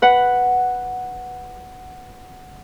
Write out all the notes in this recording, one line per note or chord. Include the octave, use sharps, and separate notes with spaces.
B4 F#5